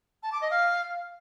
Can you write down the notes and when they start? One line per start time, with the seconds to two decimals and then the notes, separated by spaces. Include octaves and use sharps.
0.23 A5
0.32 D6
0.41 D#5
0.51 F5